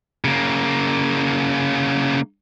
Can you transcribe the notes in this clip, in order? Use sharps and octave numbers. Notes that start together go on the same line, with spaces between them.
C#3 A#3